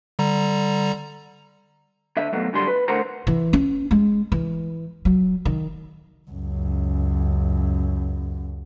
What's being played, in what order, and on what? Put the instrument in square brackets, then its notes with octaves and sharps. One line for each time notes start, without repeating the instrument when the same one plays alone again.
[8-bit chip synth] D3 G3 A#5
[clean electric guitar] D3 E5
B2 F#3 A3 A#3
F#2 D3 G3 C6
B4
A2 D3 A#4 C5 F#5 A#5
[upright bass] E3
C#4
G#3
E3
F#3
D#3
[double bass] C#2 F#2